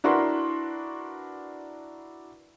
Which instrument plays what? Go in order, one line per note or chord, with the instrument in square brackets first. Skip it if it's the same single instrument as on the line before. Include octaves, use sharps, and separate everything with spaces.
[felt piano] D4 E4 F#4 A#4 B4 C6